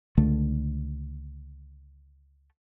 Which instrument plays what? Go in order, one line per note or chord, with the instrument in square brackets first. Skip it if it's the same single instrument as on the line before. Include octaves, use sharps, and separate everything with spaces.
[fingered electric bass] C#2 D3 A3